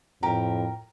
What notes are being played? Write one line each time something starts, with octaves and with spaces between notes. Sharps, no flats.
F2 A2 G4 A#4 A#5